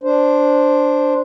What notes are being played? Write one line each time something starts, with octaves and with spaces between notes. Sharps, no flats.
D4 C5